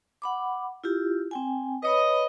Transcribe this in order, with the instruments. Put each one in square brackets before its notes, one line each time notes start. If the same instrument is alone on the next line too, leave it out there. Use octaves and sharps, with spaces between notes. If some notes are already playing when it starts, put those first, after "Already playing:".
[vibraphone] F#5 B5 D6
E4 F4 G4
C4 G5 G#5
[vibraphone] B4 C#5 B5 [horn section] D#5